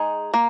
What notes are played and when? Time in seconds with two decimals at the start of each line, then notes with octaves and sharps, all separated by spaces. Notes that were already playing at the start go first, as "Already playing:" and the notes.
Already playing: G#3 D#4 G#4
0.34 A#3